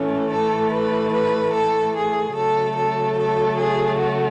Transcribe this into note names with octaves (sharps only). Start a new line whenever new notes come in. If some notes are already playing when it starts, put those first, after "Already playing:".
Already playing: A2 E3 A3 C#4
A4
B4
B4
A4
G#4
C#3 F#3 A3 A4
A4
A4
G#4
F#4